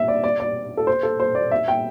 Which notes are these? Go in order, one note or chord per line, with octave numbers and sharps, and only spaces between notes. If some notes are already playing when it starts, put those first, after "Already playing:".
Already playing: E5
D5
D5
D5
A4
C5
A4
C5
D5
E5
G5